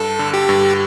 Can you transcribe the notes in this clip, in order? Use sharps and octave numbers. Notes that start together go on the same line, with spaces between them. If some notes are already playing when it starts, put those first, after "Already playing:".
Already playing: G2 A4
D3
G4
G2